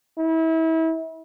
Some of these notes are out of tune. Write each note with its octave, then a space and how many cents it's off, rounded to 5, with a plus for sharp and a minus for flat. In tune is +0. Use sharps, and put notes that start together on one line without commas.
E4 -30